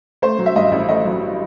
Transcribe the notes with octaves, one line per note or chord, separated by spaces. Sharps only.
A3 C5
F#3
E5
G2 D#5
A1
A3 D#5
F#3